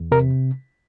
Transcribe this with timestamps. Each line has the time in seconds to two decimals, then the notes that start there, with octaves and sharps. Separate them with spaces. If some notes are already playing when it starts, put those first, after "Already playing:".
Already playing: E2
0.11 C3 A#4